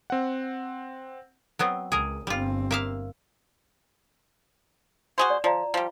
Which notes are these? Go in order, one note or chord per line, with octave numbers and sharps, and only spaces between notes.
C4 F#5
F#3 B3 C4
C#2 G#4 A#4
G1 G3 C4 F4
A#3 E5 F5
F#4 G#4 C5
D5
F3 F4 D5 A#5
F3 G3